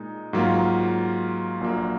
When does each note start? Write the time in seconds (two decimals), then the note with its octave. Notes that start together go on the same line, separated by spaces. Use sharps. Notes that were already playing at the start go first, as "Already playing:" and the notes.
Already playing: A#2 G#3 D#4
0.33 G#2 F#3 A#3 F4
1.61 A#1 A#2 F#3 A#3